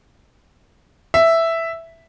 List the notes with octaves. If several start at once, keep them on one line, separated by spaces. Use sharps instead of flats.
E5